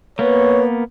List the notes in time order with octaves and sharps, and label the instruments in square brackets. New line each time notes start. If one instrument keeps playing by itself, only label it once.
[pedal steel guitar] A#3 B3 [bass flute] B4 [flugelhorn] C#5